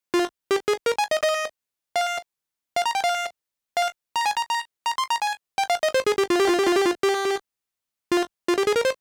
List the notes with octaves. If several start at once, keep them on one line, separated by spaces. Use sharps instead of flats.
F4
G4
G#4
A#4
G#5
D#5
D#5
F5
F5
A#5
G5
F5
F5
A#5
G#5
A#5
A#5
A#5
C6
A#5
G#5
G5
F5
D#5
C5
G#4
G4
F4
G4
F4
G4
F4
G4
F4
G4
F4
F4
G4
G#4
A#4
C5